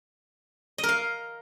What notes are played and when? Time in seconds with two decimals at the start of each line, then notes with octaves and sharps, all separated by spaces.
0.78 D#5
0.83 A#4
0.89 F5